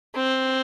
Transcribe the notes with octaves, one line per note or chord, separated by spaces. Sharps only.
C4